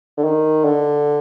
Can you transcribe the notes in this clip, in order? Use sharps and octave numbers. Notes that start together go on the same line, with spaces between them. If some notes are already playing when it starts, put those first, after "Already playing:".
D3
D#3
D3